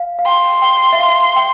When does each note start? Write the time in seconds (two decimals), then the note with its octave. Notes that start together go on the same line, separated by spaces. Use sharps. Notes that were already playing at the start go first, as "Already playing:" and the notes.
Already playing: F5
0.19 F5
0.26 G5 C6
0.62 G5
0.93 E5
0.99 F5
1.36 G5